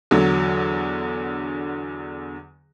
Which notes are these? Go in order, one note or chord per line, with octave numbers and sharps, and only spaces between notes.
E2 D3 F#3